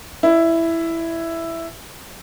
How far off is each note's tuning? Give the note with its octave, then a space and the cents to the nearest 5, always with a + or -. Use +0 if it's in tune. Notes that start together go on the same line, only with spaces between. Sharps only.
E4 +5 D#5 -40